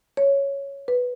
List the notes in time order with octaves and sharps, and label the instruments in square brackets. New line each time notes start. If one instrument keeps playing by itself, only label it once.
[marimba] C#5
B4